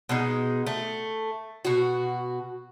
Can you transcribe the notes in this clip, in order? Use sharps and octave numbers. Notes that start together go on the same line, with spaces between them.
B2 G#3 D#4
A3
B2 F#4